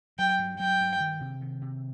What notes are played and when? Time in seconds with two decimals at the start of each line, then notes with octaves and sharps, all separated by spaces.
0.19 F#3 G5
0.39 G2
0.59 F#3 G5
0.81 G2
1.01 D#3
1.21 C3
1.41 D#3
1.62 C3